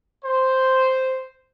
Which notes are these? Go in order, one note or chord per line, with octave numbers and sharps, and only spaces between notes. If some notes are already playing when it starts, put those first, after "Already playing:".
C5